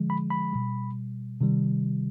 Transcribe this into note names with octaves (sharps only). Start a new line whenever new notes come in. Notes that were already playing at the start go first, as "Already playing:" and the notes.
Already playing: D3 F3 G#3
B5
B5
B2 G3
C3 D#3 G3